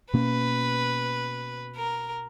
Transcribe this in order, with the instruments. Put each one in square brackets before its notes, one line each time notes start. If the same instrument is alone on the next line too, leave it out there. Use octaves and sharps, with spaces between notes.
[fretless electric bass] B2 A#3 C#4 [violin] B4
[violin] A#4